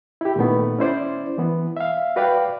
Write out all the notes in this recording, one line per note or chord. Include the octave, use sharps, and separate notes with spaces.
E4 G4
A#2 D#3 A3 B3
C#4 E4 C5 D5
E3 B3
E5 F5
F#4 B4 D5 F5 G5